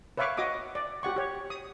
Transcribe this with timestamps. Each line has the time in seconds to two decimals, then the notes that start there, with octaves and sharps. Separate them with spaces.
0.17 B4 C#5 E5 F5 C#6 D6
0.37 F#4 D#5 D6 D#6
0.75 D5
1.03 F#4 G4 F#5 C#6
1.16 G4 C#5
1.50 D#6